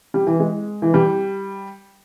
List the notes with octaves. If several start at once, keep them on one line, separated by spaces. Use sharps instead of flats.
G3
E3
G#3
E3
G3